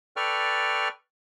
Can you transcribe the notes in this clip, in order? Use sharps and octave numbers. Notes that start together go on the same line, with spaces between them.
A4 B4 D5 G5 C#6 F6